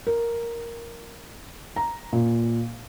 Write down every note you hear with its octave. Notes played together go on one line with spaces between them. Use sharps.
A#4
A#5
A#2